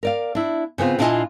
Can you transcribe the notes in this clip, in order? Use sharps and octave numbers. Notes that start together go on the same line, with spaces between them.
A#4 D5 F5
D4 E4
C#3 B3 C4 F4
A#2 D4 E4 F4 D#5 G#5